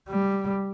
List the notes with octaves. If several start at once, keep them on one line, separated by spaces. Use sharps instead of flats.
G3